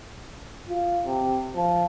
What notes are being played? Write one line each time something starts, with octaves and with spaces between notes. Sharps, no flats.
F4
C3
F3